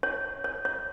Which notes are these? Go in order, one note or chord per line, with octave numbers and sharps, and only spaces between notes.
C#5
C#5
C#5